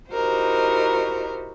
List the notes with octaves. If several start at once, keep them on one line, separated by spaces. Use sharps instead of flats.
D#4 E4 F#4 G4 A#4 C5